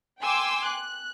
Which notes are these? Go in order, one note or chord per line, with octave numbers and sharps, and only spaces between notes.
G5 G#5 C6 D6 E6
F#6